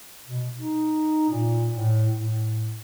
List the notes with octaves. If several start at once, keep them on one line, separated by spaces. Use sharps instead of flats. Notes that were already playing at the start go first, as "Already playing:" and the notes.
B2
D#4
A#2
A2
A2